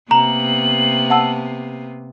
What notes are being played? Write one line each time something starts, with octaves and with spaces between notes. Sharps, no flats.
C3 A#3 B3 A#5 F#7
F#5 A5 E6